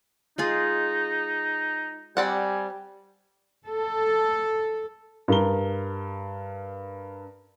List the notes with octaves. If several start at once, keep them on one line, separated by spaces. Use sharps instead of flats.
G#3 D#4 F4 G#4
G3 C4 D5 F#5 G#5
A4
G2 A#4 G7